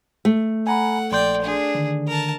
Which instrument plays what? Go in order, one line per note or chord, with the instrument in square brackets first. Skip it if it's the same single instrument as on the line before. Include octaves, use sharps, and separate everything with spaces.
[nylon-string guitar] A3
[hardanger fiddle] F#5 [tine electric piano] G#5 A#5 B5
[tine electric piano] A#1 C6 G6 [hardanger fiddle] D5 G5
[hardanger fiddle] D4 G#4
[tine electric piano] D3 D#3
[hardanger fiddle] A#4 A5